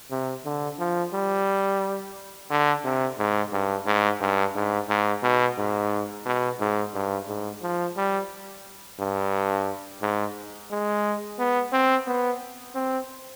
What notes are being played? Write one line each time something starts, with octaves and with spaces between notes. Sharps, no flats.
C3
D3
F3
G3
D3
C3
G#2
G2
G#2
G2
G#2
G#2
B2
G#2
B2
G#2
G2
G#2
F3
G3
G2
G#2
G#3
B3
C4
B3
C4